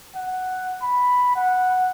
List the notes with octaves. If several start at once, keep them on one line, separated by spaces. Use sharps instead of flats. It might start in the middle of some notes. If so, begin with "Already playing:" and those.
F#5
B5
F#5